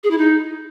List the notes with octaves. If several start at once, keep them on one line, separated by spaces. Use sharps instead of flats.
G#4
E4
D#4